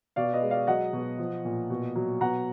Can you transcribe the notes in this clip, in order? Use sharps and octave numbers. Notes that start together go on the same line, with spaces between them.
B2 D5 F5
B4 D#5
G#3
D5 F5
F#3 D#5 F#5
B2
F3
A#2
B2
F#3
B2 F#5 A#5